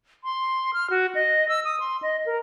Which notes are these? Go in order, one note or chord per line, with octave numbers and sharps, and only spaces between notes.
C6
F6
F#4
D#5
E6
D#6
C6
D#5
A#4